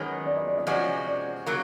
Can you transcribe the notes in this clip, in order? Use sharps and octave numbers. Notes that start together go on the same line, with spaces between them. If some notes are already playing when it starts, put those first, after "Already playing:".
Already playing: F#2 D#3 G#3 B3 C#5
D5
D#5
D5
D#5
C3 F3 G#3 C#4 F#4 D5
D5
C#3 F#3 A#3